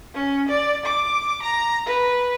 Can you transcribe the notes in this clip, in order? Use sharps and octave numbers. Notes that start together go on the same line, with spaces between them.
C#4
D5
D6
A#5
B4